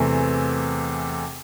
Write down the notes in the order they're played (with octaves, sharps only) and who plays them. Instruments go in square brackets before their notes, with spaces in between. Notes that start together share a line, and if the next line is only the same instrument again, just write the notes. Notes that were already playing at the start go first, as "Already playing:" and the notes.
Already playing: [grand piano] E2 C3 E3 A3